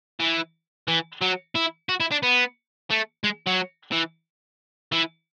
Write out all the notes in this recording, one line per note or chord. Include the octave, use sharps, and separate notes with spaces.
E3
E3
F#3
E4
F#4
E4
D4
B3
A3
G#3
F#3
E3
E3